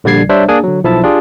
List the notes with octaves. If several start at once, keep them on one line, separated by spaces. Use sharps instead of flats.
A#1 D3 G3 D5 G#6 C7
G3 D4 C5 C#5 E5
A#3 D4 G#4 G#5
D3 F#3
B1 F3 E4 E5 A5
D4 F4 G4 G#4